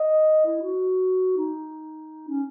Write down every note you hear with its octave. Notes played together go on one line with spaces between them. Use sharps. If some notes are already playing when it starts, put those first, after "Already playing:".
Already playing: D#5
E4
F#4
D#4
C#4